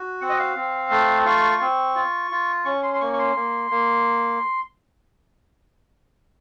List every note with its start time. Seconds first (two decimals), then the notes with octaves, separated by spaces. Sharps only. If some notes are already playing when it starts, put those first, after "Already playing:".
Already playing: F#4
0.21 C4 F#5
0.29 D#5
0.39 F5
0.57 C4
0.91 A3
1.25 F4 C#6
1.61 C4
1.96 F4
2.31 F4
2.65 C#4 C#6
2.83 C6
2.94 C6
3.01 A#3 C#6
3.13 C#6
3.19 C6
3.36 A#3
3.71 A#3